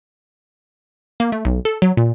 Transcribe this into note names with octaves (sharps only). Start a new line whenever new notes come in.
A#3
A3
B1
A4
F#3
A#2